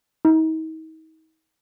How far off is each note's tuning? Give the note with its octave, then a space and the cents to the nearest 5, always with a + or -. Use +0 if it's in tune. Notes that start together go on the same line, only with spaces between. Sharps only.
D#4 +40